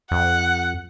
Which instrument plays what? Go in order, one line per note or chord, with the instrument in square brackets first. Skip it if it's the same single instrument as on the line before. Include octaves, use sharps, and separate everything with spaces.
[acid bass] F2 [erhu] F#5